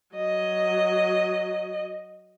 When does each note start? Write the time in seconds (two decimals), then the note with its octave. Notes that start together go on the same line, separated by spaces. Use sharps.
0.16 F#3 D#5